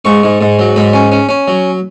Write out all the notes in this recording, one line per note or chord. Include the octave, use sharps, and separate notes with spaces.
G#2 C#6
G#2
G#2
F#3
G#2 B5
C#4
C#4
C#4
F#3